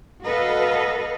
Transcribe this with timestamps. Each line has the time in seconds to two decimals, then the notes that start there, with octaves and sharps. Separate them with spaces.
0.24 F#4 A4 B4 D#5 F5